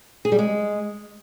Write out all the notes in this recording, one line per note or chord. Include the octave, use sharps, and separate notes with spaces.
G#4
G3
G#3